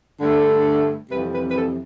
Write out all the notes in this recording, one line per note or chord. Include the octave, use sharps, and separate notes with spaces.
G2 D3 A3
F2 C3 E3 G3 B4
B4
B4
A4